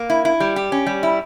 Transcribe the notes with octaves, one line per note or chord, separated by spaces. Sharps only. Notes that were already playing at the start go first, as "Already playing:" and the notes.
Already playing: A#3
E4
E4
G3
G4
C#4
G3
E4